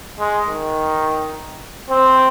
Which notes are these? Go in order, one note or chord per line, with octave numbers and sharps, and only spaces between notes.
G#3
D#3
C4